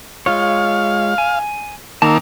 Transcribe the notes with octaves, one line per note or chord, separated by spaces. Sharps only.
G#3 F4 C#5 F5
G#5
D#3 A#3 A5 A#5 E6